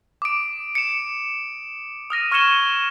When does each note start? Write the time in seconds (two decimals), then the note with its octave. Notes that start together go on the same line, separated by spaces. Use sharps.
0.22 D6 D#6 D7
0.75 C#7 E7
2.10 D#6 F6 A#6 D#7
2.32 C#6 F6 G#6 C#7 E7 G7